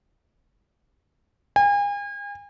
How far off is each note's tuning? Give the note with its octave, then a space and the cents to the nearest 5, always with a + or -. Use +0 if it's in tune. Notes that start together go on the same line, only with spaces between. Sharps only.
G#5 -40